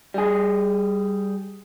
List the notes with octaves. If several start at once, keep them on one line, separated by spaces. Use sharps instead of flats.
G3 G#4